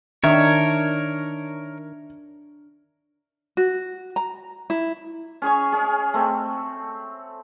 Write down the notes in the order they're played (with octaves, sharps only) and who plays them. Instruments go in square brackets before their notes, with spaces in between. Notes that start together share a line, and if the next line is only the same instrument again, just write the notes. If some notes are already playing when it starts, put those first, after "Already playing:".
[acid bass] D#3 [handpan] D4 [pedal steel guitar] A#4 C#5 [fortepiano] E5
[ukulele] F#4
A#5
E4
[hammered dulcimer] C#4 G#4 C#5 G#5
C#4 G#4
A3 C4